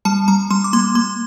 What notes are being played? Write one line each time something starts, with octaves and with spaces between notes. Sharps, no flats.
G3 A5
G3 A#5
G3 C6
D6
A#3 C6
A#3 C6